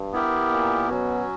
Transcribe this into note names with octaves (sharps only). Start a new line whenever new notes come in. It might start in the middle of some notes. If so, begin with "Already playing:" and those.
Already playing: G2
B3 E4 G4 A#4
A#2
B2 F#3 C#4 F#4